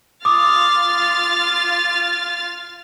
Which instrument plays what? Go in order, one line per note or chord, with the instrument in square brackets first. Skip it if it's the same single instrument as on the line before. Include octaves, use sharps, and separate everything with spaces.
[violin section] F4 F6 A6 [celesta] D6 D#6